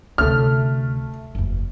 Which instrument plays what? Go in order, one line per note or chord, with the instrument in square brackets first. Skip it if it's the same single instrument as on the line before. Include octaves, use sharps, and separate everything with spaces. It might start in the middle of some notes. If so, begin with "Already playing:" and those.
[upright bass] D2 C3 [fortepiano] A3 F6
[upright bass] F#1 E2